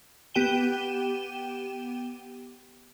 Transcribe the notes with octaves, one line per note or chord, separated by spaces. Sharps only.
B3 G4 G5 D#7 E7 G7